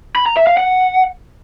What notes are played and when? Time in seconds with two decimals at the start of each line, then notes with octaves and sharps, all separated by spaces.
0.16 B5
0.26 A#5
0.37 E5
0.47 F5
0.57 F#5